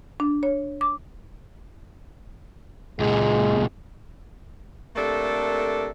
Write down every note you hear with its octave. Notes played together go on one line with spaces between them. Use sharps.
D4
C#5
D6
C#2 A#2 G#3
C3 A3 A#3 D4 A4 A#4